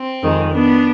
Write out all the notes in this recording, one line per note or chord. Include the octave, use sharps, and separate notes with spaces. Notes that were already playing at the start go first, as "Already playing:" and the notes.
Already playing: C4
F2 D#3 G#3
B3 D4